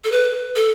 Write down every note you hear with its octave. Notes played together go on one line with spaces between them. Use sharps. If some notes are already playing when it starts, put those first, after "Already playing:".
A4
B4
A4